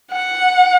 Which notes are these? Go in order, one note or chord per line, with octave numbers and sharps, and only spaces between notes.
F#5